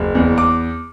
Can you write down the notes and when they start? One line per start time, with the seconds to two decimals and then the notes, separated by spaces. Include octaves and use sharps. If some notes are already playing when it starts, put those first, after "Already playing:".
Already playing: F#1
0.15 E2
0.38 D6